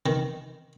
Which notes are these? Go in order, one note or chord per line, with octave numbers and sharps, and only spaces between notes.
D#3